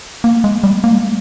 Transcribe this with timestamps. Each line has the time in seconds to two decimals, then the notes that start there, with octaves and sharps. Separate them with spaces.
0.24 A#3
0.44 G#3
0.64 G3
0.84 A#3
0.92 G#3
1.02 G3